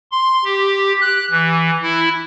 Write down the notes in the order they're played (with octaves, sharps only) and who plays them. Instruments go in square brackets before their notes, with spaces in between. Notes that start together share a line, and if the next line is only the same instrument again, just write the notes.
[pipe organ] C6
G4
F#6
E3
E4